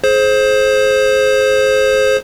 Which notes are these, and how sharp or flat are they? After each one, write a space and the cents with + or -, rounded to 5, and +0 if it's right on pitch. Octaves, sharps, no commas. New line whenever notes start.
G#4 +35 C5 +15